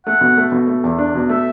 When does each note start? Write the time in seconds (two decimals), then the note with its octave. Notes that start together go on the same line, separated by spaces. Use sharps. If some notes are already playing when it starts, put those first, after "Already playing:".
0.06 A3 F#5
0.21 B2
0.37 A3
0.52 B2
0.67 A3
0.84 E2
0.98 D4
1.15 B2
1.29 A3 E5